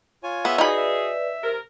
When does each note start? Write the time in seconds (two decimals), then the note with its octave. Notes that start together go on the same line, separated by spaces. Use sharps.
0.23 F4 C#5 G#5
0.45 B3 G#4 E5 E6
0.58 D#4 F#4 G#4 B4 D5 B5
0.77 E5
1.43 C3 A#4